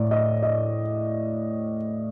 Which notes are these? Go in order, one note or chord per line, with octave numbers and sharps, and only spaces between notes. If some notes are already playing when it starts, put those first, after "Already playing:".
Already playing: A2 D5
D#5
D#5